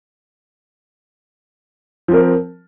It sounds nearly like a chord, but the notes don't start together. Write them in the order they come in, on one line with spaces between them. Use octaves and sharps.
F3 C4 A#4